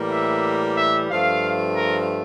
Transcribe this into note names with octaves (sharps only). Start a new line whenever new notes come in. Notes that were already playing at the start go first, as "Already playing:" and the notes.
Already playing: A2 E3 G3 A#3
E5
E5
G2 F3 A3 F5
A#4